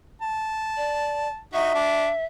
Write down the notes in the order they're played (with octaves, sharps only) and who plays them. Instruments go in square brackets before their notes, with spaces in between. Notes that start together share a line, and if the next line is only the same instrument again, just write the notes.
[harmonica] A5
[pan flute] D5
[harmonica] D#4 F#4 [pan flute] E5
[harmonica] D4